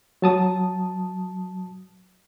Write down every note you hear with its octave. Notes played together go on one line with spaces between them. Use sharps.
F#3 A5 D#6